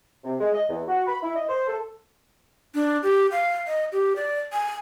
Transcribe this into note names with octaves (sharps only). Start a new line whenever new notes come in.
C3
G#3
D#5
E2
F#4
B5
E4
D#5
C5
A4
D4
G4
F5
D#5
G4
D5
G#5